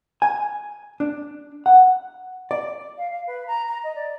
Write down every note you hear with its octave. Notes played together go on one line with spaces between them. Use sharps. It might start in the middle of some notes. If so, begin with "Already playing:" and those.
G#5
D4
F#5
D5
F5
F5
B4
A#5
A#5
D#5
D5